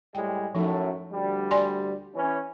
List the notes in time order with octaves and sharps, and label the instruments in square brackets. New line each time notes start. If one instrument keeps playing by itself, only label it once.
[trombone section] A2 G3 G#3 [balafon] G5
[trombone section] F#2 A2 A3 [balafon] F3 D#4
[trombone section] D2 G3
[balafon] D5 G#5 C6
[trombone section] E3 C#4